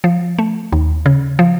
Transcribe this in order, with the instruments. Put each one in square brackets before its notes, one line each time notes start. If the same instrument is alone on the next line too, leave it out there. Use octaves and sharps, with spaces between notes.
[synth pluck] F3
A3
D#2
C#3
F3